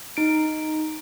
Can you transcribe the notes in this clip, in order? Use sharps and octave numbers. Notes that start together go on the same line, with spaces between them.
D#4 D7